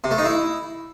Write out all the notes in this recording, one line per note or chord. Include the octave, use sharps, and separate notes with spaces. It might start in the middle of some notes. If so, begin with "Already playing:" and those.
C3
A3
D#4
E4